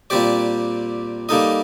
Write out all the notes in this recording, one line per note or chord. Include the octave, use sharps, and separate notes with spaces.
A#2 G3 C4 G4 D5
G3 A#3 D#4 A4 D#5